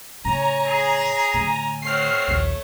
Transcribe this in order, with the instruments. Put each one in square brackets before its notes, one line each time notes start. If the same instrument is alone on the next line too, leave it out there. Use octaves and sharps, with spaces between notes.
[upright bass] A2 C#3 [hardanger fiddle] C#5 G#5 [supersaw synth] A#5
[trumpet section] G#4
[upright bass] A2 D3 [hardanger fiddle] G#5
[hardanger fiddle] A3 C#5 [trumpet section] C4 F#4 [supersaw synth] F6 C7
[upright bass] A#1 D#2